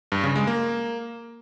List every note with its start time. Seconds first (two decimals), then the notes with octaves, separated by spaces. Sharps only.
0.12 G2
0.24 C#3
0.35 G#3
0.47 A#3